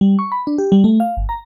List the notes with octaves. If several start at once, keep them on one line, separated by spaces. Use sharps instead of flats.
G3
C#6
B5
D4
G4
G3
A3
F5
G1
A#5